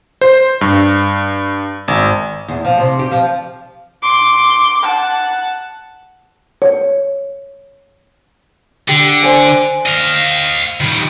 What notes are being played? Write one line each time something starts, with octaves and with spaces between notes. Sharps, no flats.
C5
G2
G#1
E2
F3
C3
G4
F3
C6 D6
F#5 A5
C#5
D3 G4
C5 D5 G#5
D#5 F5
D#3 G3